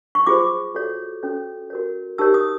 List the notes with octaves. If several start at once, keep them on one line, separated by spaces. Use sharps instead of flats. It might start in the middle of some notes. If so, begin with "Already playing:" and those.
C#6
F4 G#4 C5 D6
F#4 A4 C#5
C#4 F#4 A4 C#5
F#4 A#4 C#5
D#4 G4 A#4 C#5 E6
D#6